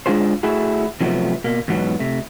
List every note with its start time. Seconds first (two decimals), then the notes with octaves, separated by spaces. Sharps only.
0.06 G#3 D4 F4 G#4 C5
0.43 A3 E4 F#4 G#4
1.01 C3 F3 F#3 A3 B3
1.44 B2 A#3
1.68 E2 G#2 F#3 B3
1.99 C3 A3